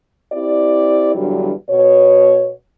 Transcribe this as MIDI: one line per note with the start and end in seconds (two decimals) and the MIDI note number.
0.32 1.12 60
0.32 1.12 64
0.32 1.12 67
0.32 1.12 74
1.15 1.51 40
1.15 1.51 43
1.15 1.51 50
1.15 1.51 54
1.15 1.51 55
1.68 2.51 47
1.68 2.51 73